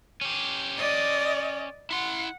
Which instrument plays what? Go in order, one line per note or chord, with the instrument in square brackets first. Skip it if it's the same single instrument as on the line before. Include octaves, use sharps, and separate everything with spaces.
[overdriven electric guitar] C#4 G4
[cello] D5 D#5
[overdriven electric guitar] E4 C6 [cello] F#5